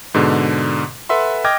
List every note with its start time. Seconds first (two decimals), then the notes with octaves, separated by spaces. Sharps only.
0.14 G#2 B2 D3
1.09 A4 B4 E5 F#5 C6
1.44 D#5 G5 D6 F6 G#6 A#6